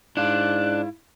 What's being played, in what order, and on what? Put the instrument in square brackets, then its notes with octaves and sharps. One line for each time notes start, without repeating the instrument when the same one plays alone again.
[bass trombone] G#2 [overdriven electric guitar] D4 [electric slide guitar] E4 F5 [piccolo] F#6